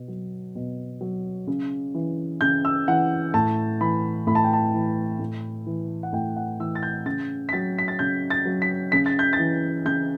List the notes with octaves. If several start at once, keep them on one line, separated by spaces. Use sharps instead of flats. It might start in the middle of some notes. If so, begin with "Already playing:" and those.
Already playing: B2
F#3
B2
F#3
C#3
E3
C#3 G6
E6
E3 F#5
A2 A5
E3 B5
A2 B5
A5
G5
A5
E3
A2
E3
F#5
A2 G5
F#5
E3 E6
A6
G6
C#3 A6
B6
F#3 A6
B6
A6
C#3 G6
A6
F#3
B6
C#3 B6
A6
G6
A6
E3
C#3 G6